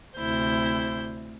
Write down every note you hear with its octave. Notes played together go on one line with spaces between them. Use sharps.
D2 C3 E4 C5 G6